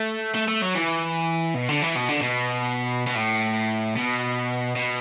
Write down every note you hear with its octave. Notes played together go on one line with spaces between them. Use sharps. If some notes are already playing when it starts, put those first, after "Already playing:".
Already playing: A3
A3
A3
F#3
E3
B2
D3
E3
B2
D3
B2
B2
A2
B2
B2